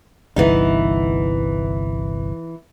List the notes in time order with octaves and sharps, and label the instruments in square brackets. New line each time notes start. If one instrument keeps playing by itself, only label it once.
[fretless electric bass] G1 C2 [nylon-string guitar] E3 B3 D#4